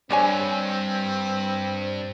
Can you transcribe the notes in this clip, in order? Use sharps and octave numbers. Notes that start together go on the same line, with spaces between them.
G2 C4 D4 C#5 G#5